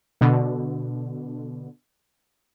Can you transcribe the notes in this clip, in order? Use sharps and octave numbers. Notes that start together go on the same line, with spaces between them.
B2 D3